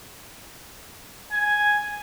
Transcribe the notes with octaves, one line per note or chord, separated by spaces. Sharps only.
G#5